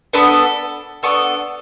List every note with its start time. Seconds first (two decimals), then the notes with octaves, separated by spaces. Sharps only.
0.13 B3 D4 A4 B5
1.03 B3 D4 A4 C#6